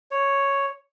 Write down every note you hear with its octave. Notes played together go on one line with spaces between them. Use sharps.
C#5